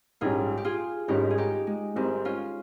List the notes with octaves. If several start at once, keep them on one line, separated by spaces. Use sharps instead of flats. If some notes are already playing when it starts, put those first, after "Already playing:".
A#1 G#2 G3 C#4 F4 G#4
G4
F4 G#4
G#1 G#2 G3 C#4 D#4 G4
G#4
D#4 G4
G#3
G#1 G#2 G3 G#3 C4
C#4 F4